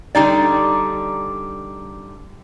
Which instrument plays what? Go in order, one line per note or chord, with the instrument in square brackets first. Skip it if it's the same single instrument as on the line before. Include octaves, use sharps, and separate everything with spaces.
[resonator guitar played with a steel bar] D3 G3 D#4 D5